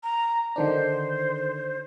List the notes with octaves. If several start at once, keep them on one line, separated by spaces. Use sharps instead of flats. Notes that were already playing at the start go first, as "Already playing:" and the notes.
A#5
D3 D#3 D4 C5